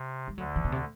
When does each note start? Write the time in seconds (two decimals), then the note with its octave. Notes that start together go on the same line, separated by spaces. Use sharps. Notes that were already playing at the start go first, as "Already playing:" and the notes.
Already playing: C3
0.28 G3
0.38 D2 D3 F#3
0.56 E3
0.65 B2
0.72 C3